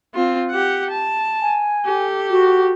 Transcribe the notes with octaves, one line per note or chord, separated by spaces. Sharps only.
C4 F4
G4 F#5
A5
G#5
G4 A4
F#4